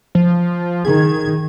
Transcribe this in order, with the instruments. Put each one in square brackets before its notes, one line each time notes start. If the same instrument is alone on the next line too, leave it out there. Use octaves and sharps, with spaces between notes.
[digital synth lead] F3
[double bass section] D#3 [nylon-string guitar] G#4 A#4 [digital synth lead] G#6